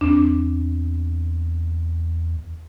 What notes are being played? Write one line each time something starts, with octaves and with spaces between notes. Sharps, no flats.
E2 C4 D4